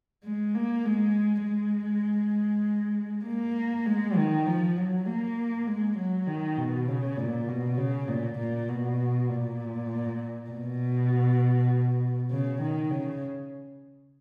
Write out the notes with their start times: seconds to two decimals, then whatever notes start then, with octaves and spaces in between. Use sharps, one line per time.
0.24 G#3
0.55 A#3
0.85 G#3
1.45 G#3
3.26 A#3
3.87 G#3
4.17 D#3
4.47 F3
4.77 F#3
5.07 A#3
5.67 G#3
5.98 F#3
6.27 D#3
6.58 B2
6.88 C#3
7.18 A#2
7.49 B2
7.78 C#3
8.09 A#2
8.39 A#2
8.69 B2
9.29 A#2
10.50 B2
12.31 C#3
12.61 D#3
12.91 C#3